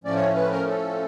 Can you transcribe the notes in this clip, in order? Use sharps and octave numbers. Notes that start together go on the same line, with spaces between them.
A2 F3 A3 C#4 D5
C#5
B4
A#4
A4